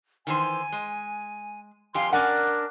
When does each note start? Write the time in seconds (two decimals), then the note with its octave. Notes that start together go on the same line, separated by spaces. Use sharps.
0.27 D#3 E3 C5 G#5
0.72 G#3
1.94 F2 G4 F5 G#5 C6
2.13 C#4 D4 A#4 D5 F#5 G#5 F#6